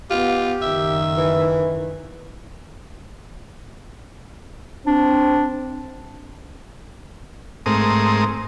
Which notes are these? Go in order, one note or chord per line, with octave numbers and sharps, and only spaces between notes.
B3 F4 G4
F#1 D#3 E5
E3
C4 D4
G#2 A3 C4 A#4 D#6